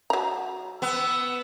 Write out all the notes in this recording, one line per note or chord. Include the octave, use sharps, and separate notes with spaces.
F#3 A#5
B3 E6